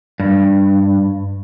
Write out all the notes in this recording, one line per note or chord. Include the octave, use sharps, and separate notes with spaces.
G2